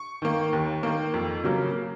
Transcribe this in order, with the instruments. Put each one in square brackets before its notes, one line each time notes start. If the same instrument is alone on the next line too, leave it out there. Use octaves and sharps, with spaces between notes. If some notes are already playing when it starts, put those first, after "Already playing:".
Already playing: [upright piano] C#6
D#3 A#3
D#2
D#3 A#3
F2
C#3 F#3 A#3